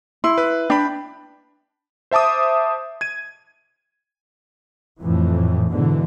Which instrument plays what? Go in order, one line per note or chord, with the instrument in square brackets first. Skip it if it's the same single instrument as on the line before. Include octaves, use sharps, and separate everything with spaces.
[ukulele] E4 [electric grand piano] C6
[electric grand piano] B4 F#6
[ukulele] D4 [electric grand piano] G5 B5
[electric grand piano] C5 E5 A5 D6 D#6
G#6 D#7
[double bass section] F2 A2 E3
G#2 B2 D3 E3